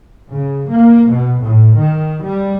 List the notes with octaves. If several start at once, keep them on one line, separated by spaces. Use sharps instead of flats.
C#3
A#3
B2
A2
D#3
G3